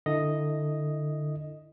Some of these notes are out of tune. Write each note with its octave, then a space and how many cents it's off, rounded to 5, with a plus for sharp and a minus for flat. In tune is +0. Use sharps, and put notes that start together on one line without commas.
D3 +20 E4 +0 D#5 +0